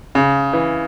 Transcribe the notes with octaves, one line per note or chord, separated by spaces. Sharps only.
C#3
E3